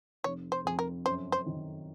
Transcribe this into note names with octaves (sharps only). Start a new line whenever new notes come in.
F1 C#5
C5
F2 G#4
A#4
F#2 C5
C5
D#3